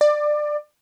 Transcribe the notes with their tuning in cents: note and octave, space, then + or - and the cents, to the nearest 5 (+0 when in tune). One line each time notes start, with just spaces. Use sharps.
D5 +20